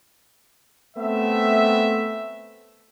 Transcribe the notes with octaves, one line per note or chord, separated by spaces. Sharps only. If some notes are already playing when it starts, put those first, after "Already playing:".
A3 B3 C4 E5